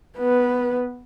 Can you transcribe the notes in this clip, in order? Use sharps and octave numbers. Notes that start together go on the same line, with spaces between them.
B3 B4